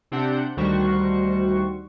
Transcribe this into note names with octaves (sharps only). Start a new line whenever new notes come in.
C3 C4 D4 G4 F#5 G6
D2 D#3 G3 F#4 C5 C#6